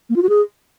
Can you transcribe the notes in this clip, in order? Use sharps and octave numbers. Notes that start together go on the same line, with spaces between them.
A#3
F4
F#4
G#4